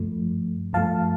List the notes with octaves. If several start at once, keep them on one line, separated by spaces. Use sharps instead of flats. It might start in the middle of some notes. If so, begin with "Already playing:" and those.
Already playing: G2 F3 A3
G2 F3 A3 F5 A5